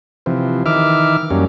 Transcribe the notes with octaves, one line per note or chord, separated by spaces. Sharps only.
C3 E3 F3
D#3 E3 E5 D6 F6
F#2 G3 A#3 C#4